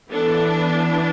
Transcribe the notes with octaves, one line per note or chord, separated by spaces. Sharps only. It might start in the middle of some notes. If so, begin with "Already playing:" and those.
E3 B3 D4 A4